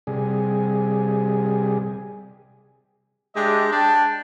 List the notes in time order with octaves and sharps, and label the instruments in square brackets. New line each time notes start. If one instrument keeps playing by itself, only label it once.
[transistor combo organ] C3 G3 G#4
[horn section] G#3 D4 G4 D#5 E5
D4 G5 A5